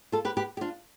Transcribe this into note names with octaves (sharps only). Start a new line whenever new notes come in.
F4 A4
G4 B4
G4 B4
G4
D4 F4